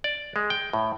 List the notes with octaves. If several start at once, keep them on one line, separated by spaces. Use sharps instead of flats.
D5
G#3
G5
A2